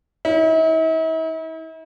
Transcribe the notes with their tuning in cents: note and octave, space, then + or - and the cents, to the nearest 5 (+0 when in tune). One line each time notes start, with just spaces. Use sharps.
E4 -45